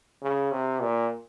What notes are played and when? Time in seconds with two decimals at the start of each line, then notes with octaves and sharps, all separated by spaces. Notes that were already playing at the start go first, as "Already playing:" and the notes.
0.22 C#3
0.52 C3
0.81 A#2